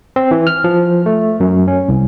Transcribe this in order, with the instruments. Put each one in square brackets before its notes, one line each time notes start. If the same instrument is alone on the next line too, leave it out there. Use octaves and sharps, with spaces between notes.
[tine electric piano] C4
E3
F6
F3
A3
F#2
C#4
C2